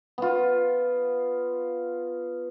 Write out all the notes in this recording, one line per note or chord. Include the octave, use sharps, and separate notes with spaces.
B3 F4